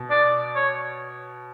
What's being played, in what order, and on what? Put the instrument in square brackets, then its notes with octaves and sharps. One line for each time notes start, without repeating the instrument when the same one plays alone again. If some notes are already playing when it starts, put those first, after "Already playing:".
Already playing: [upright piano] B2
[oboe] D5
C#5